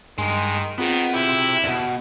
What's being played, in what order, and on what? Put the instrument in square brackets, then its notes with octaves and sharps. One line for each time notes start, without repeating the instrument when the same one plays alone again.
[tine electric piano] G2 [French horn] D#3 [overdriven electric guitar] G#3
[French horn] D#3 [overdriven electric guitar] B3 [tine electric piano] C4 F4 G#4
[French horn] E4 [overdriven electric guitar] G4 E5
[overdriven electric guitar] D2 B2